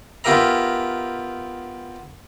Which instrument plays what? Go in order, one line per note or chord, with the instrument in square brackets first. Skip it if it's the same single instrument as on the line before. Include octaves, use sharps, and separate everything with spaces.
[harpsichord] B3 F4 G4 A#4 E5 A#5